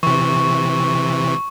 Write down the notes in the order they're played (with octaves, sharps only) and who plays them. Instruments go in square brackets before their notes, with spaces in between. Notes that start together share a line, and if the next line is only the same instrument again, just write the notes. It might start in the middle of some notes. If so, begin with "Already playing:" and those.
[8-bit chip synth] C3 E3 [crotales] C#6